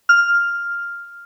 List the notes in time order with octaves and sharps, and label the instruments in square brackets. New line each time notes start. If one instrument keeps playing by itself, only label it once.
[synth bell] F6